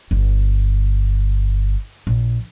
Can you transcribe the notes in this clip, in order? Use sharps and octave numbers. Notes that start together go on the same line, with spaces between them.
G1
A#1